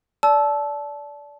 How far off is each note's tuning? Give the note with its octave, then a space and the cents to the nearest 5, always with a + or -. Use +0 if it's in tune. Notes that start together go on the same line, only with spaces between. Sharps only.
D5 -20 A5 -20 E6 +0